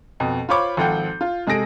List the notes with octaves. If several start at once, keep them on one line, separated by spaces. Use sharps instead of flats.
F2 B2
F4 C5 C#5 B5 C#6 D6
G#1 F3 A4 F#5 G5 G6
F4
C3 G#3 G#4 A4 A#6 D7